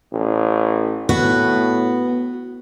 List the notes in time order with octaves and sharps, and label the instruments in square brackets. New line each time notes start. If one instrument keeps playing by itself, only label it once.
[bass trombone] A1
[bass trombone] A2 [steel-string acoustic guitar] B3 [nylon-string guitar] F#4